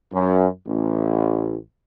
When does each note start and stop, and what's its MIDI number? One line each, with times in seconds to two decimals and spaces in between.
0.13 0.48 42
0.66 1.56 33